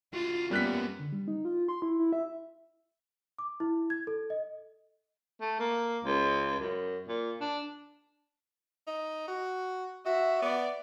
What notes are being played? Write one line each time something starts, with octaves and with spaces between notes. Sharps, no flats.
F4 F#4 F5
G3 A#3 B3 C#4 A#4 F#6 B6
D3
G3
D#4
F4
C6
E4
E4
E5
D6
E4
G#6
A4
D#5
A3
A#3
C#2
F#2
A#2
D4
D#4
F#4
F#4 E5
B3 D5